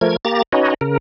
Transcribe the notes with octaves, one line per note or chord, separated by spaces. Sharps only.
F3 A3 A#4 G#6
A#3 G4 A#5 A6
C#4 D#4 F#4 B4 C#5 D#5
C#3 A#4